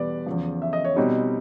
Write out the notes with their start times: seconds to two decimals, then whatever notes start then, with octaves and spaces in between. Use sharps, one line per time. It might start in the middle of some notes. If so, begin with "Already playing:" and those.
Already playing: E2 B2 G3 B4 D5
0.26 E2 C#3 F3
0.62 E5
0.73 D#5
0.84 C#5
0.96 B2 G3 C4 D#4